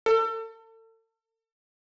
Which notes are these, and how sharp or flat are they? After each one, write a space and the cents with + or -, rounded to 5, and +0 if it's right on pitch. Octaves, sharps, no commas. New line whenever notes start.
A4 +35